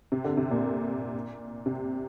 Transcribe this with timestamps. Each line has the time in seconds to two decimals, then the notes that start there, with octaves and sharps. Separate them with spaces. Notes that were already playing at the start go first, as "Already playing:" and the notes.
0.12 C3
0.24 D3
0.37 C3
0.51 A#2
1.66 C3